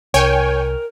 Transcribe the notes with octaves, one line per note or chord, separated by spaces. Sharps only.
C2 A#4 C#5 G5 G#5